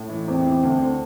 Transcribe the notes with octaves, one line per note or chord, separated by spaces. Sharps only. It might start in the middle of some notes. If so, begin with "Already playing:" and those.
Already playing: A2
E3
E2 C4
E3
D2
D3